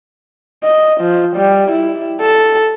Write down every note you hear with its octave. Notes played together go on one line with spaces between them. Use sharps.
D#5
F3
G3
E4
A4